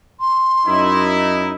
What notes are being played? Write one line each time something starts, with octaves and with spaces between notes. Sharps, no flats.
C6
F#2 D#4 E4